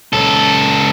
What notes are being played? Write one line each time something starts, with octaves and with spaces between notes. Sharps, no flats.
C#2 A4